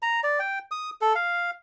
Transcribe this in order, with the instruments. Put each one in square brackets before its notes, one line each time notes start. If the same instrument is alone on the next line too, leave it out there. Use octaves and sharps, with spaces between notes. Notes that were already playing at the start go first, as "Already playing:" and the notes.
[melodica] A#5
D5
G5
D#6
A4
F5